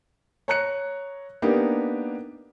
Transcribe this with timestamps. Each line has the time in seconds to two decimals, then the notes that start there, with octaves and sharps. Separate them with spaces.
0.48 C#5 A#5 F#6 C#7
1.42 A#3 B3 D4 D#4 G4